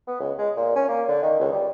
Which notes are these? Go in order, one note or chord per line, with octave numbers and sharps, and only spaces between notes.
B3
C#2
G#3
A#2
C#4
A#3
D3
D#3
C#2
G3